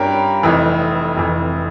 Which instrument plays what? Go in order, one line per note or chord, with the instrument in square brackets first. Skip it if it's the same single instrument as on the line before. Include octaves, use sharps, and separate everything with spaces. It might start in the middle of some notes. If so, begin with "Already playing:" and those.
Already playing: [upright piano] G2 G3 C#4 G4 A#4
F1 F2 E3
F1 F2 E3